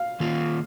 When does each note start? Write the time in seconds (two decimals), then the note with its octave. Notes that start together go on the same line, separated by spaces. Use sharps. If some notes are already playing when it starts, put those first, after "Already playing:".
Already playing: F5
0.20 D#3 A#3 F4